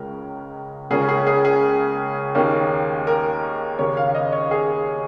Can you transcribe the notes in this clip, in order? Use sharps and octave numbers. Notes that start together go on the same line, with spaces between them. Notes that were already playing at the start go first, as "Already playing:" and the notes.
Already playing: C#2 C#3 G#3 A#4
C#2 C#3 A#3 C#4 G#4
G#4
G#4
G#4
D#2 D#3 A#3 C#4
A#4
D#2 C#3 A#3 C#4 C#5
F5
F5
D#5
C#5
G#4